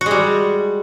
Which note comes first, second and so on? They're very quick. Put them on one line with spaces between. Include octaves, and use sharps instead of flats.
F#4 G#3 G3